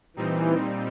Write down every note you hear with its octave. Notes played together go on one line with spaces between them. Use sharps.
A#2 E3 G3 C4 D#4